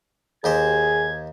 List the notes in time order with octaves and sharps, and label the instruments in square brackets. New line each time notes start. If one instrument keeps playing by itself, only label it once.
[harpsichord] D#2 G4 C5 [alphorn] G#4 [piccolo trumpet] G#6